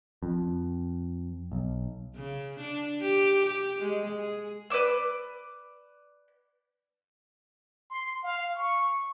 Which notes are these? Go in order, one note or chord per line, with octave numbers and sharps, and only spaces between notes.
F2
B1
C#3
D4
G4
G4
G#3
G#4
B4 D5 D6 E6
C6
F5
C#6